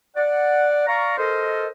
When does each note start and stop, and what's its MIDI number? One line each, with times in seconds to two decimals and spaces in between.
0.16 0.86 74
0.16 0.86 78
0.87 1.15 74
0.87 1.15 77
0.87 1.15 82
0.87 1.15 85
1.18 1.67 69
1.18 1.67 70
1.18 1.67 72
1.18 1.67 75